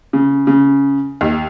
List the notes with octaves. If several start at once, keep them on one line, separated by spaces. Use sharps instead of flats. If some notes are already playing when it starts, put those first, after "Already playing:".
C#3
C#3
D#2